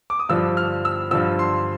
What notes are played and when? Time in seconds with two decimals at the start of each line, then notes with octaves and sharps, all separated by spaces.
0.10 D6
0.19 D#6
0.29 G2 D3 F3 E6
0.57 F6
0.85 E6
1.11 G2 D3 F3 E6
1.39 C6